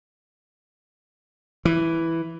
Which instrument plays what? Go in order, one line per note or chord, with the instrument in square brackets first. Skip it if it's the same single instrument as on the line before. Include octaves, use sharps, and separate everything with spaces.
[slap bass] E3